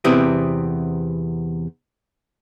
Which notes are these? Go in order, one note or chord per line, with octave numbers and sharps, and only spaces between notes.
E2 C3 B3 C4 E4 G4